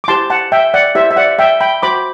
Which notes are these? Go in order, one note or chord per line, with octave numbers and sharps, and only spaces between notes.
D6
E4 G4 C5 A5 C6
F#5 A5
E5 G5
D5 F#5
E4 G4 C5 E5
E5
D5 F#5
E5 G5
G5 B5
F#4 C5 B5 D6